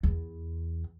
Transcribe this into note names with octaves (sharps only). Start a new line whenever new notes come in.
E2